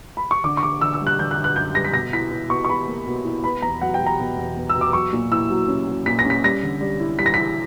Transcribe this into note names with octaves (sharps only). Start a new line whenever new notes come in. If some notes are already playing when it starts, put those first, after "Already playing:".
B5
C#6
D3 D6
C#6
D3 D6
D3 E6
E6
G3
F#6
D3 G6
F#6
D3
F#6
F#2 G6
G3 A#6
B6
B2 A#6
E4 B6
E4
B2 C#6
C#6
B2 B5
A#3
B2
E4
B3 B5
E2 A#5
F#3 F#5
G5
F#3
A#5
B2
E2
B3
E6
B2
D6
F#3 C#6
A#2
E4 E6
F#3
C#4
F#3
A#2 B6
A#6
C#4
B6
G3 A#6
D3
G3
E4
G3 B6
A#6
E4 B6